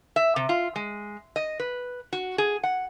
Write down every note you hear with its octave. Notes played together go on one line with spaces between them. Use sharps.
E5
C3
F4
G#3
D#5
B4
F#4
G#4
F#5